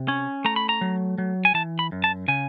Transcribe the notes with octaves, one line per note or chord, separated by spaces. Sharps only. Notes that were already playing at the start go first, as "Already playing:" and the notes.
Already playing: C3
C#4
A3 A#5
B5
A#5
F#3
F#3
G#5
E3 A5
B5
F#2
A5
C#3 G#5